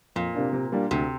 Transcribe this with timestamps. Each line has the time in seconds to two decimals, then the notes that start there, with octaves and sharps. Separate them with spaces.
0.16 F2 A#2
0.35 C3 A#3 D4
0.53 C3
0.72 G3 A#3 D4
0.91 D2 C3